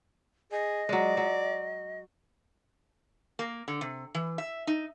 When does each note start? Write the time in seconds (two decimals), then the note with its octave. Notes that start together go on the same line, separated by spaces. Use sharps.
0.52 G#4 D#5
0.89 F#3 G#3 D5
1.17 F#3
3.39 A#3
3.68 D3
3.81 C3
4.15 E3
4.38 E5
4.67 D#4